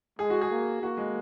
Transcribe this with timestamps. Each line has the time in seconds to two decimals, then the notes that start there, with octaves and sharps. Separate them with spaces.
0.19 G#3 G#4
0.30 F#4
0.41 G#4
0.51 A#3
0.82 A#3 F#4
0.97 G#3